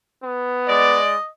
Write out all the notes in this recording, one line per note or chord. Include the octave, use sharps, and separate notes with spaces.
B3
G#3 D5 D#5